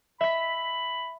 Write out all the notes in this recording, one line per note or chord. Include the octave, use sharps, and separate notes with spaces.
E5 B5 B6